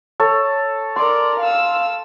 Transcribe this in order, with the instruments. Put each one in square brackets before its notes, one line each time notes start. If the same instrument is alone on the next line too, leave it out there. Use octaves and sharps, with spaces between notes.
[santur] A4 C#5
[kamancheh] A#4 D5 [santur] C6
[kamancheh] F5 E6